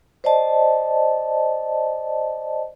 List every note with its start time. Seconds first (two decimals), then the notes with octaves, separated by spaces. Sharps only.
0.24 C5 D5 D#5 A5